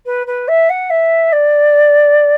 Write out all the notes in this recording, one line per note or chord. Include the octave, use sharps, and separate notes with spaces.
B4
B4
E5
F#5
E5
D5